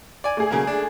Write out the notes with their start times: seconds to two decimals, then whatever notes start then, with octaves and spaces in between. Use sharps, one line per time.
0.24 D5 G#5
0.37 A3 G#4
0.51 C#3 F#3 A#3
0.67 D4